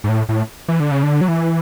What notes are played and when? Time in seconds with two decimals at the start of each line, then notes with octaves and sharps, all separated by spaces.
0.04 G#2
0.09 A2
0.29 A2
0.68 E3
0.80 D3
0.91 C#3
1.03 D3
1.21 F#3
1.28 E3